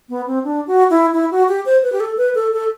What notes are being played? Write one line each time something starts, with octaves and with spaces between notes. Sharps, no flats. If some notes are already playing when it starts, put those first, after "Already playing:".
B3
C4
D4
F#4
E4
E4
F#4
G4
C5
B4
G4
A4
B4
A4
A4